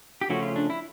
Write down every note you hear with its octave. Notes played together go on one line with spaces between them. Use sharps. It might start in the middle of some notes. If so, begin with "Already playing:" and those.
G4
C#3 F3 A3 C#4 F#4
F4
D4
E4